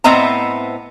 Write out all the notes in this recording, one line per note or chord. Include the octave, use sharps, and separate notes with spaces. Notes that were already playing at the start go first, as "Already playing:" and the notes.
A2 B3 C4 D#5 E5 A#5